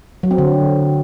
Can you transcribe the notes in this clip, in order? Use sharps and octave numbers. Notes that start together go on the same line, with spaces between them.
F#3
C4
D3